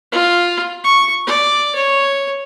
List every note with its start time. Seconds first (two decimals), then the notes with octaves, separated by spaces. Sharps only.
0.12 F4
0.84 C#6
1.27 D5
1.76 C#5